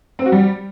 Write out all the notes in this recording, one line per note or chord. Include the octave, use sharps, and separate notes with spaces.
C4
F#4
G3